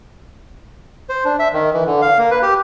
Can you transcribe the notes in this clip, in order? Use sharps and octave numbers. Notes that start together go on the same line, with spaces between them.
C5
D4
E5
D#3
E3
D3
F5
A#3
B4
G4